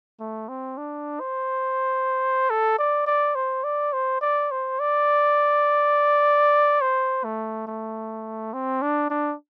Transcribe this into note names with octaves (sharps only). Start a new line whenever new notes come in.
A3
C4
D4
C5
A4
D5
D5
C5
D5
C5
D5
C5
D5
C5
A3
A3
C4
D4
D4